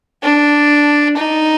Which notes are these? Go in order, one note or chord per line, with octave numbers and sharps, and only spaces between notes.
D4
D#4